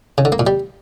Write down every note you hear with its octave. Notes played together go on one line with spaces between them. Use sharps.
C#3
D3
A#3
A#2
G3